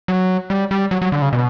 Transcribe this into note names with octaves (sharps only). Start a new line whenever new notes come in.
F#3
G3
G3
F#3
F#3
D3
C#3
B2